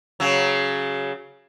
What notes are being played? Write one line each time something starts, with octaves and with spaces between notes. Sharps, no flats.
C#3 F#3